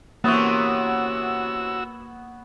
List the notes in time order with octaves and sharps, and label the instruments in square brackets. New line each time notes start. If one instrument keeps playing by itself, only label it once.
[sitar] C3 E3 C#4 [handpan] A#3 [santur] B3 C#5 [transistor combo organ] F#4 E6